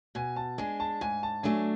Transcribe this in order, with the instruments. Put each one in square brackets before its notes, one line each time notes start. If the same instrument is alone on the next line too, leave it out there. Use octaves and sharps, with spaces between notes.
[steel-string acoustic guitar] B2 [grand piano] G#5
[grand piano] A5
[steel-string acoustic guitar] G#3 D4 [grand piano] G#5
[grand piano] A5
[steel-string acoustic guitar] G#2 [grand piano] G#5
[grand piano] A5
[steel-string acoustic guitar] F#3 A3 D4 [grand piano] G#5